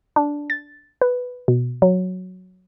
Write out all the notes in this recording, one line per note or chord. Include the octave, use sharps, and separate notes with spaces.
D4
A6
B4
B2
F#3